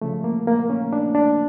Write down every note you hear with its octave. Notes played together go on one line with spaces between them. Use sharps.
C#3 F3 A3
A#3
A#3
C#4
D4
D4